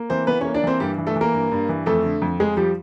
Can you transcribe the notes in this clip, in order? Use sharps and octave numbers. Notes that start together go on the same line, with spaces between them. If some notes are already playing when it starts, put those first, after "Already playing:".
Already playing: A#3
E3 C4 C5
E3 B3 B4
A#3 C#4 C#5
D4 D5
E3 C4 C5
G2 G3 G4
E3
A3 A4
E3
A#3 A#4
G2
G2
E3
F2 A3 A4
D3
F2
F2 G#3 G#4
F3 G3 G4